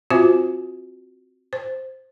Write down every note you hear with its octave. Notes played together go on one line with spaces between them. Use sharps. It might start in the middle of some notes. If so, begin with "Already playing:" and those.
C4 F4 F#4 C5 E5 G#5
C5